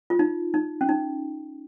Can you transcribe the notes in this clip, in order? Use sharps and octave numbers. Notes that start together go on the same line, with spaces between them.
F4
D#4
D#4
C#4
D#4